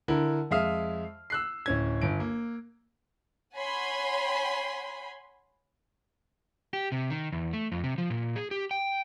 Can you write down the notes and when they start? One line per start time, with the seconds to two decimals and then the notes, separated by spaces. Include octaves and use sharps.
0.08 D3 E4 A#4
0.51 F2 G#3 E5 F5 D#6 F6
1.30 E6 F#6 C7
1.66 D1 C#4 G#6
2.02 G1 D7
2.20 A#3
3.56 C#5 F#5 G#5 B5 C6
6.73 G4
6.92 C3
7.10 D#3
7.32 E2
7.53 A3
7.72 F2
7.84 C3
7.98 F3
8.10 A#2
8.36 G#4
8.51 G4
8.71 G5